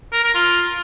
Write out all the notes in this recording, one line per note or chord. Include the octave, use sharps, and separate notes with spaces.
A#4
A#4
F4